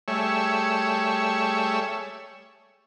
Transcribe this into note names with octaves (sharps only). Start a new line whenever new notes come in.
G3 A3 G#4 C#5 E5